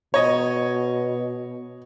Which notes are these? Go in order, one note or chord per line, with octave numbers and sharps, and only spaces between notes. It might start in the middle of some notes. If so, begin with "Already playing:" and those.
B2 C#5 D#5